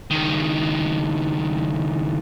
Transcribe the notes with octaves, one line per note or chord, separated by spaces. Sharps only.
C#2 D#3